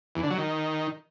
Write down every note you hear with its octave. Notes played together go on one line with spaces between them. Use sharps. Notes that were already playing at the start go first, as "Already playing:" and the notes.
E2
D3
F#3
D#3